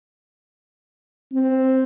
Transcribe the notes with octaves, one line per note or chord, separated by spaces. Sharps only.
C4